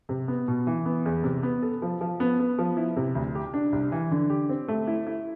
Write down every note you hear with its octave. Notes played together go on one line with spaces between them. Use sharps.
C3
B3
B2
E3
B3
E2
C3
B3
A4
F3
F3
B3
B3
F3
E4
C3
D2
G4
D4
C2
E3
D3
G4
C4
A3
E4
E4